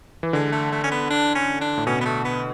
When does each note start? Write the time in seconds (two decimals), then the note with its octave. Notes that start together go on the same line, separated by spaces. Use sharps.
0.23 E3
0.33 D3 G#3
0.52 A3
0.72 A3
0.84 C#4
0.91 B3
1.10 D4
1.35 C#4
1.61 D4
1.78 A2
1.87 B2 C#4
2.01 B3
2.05 A3
2.25 B3